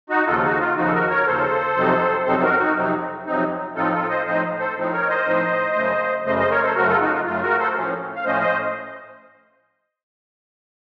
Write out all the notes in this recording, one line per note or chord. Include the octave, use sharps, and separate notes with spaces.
D#4 F#4
D#2 C#3 F3 F4 A4
D#4 F#4
F4
D#2 C#3 F3 D#4 F#4
A4
F#4 A#4
A#4 C#5
D#2 C#3 F3 A4 C5
F2 C3 F#3 C4 D#4
F2 C3 F#3 C4 D#4 A4 C5
F#4 A#4
D#4 F#4
F2 C3 F#3 C4 D#4
F2 C3 F#3 C4 D#4
A2 F3 C4 D#4 F4 A4
F4 A4
C5 D#5
A2 F3 C4 D#4 C5 D#5
A4 C5
A2 F3 C4 D#4
A#4 C#5
C5 D#5
A2 F3 C4 D#4
F#2 C#3 A3
F#2 C#3 A3 C5 D#5
C5 D#5
A#4 C#5
A4 C5
F#2 C#3 A3 F#4 A#4
F4 A4
D#4 F#4
F4
F#2 C#3 A3 F4
F#4 A#4
A4 C5
A2 F3 A3 C#4
F5
A2 F3 A3 C#4 C5 D#5
C5 D#5